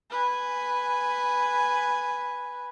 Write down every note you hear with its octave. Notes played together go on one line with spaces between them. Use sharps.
B4 G#5